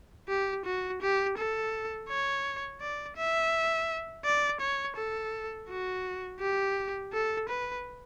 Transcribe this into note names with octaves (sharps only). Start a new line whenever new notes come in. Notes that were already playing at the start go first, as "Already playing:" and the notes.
G4
F#4
G4
A4
C#5
D5
E5
D5
C#5
A4
F#4
G4
A4
B4